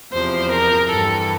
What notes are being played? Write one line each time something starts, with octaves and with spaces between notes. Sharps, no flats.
E2 C3 F3 C5
A#4
G2 E3 G3 A4